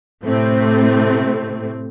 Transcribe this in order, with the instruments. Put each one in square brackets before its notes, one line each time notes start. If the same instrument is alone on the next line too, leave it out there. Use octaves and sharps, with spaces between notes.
[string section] A2 C3 A3 C4